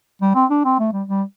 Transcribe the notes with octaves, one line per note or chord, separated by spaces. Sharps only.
G3
C4
D4
C4
A3
G3
G3